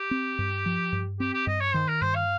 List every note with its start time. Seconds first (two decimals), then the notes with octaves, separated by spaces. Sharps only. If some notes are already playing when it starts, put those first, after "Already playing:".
Already playing: G4
0.11 C4
0.38 G2
0.66 F3
0.92 G2
1.20 C4 G4
1.33 G4
1.47 G2 D#5
1.61 C#5
1.74 D#3 C5
1.88 A#4
2.01 G2 C5
2.15 F5